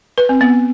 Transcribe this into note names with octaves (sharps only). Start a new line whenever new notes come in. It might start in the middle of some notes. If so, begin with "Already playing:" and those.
B4
C4
B3